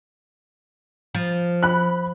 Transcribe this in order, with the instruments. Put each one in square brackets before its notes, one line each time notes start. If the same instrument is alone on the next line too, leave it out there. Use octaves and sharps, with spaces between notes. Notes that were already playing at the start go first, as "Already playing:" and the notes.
[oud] F3
[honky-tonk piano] B5 F#6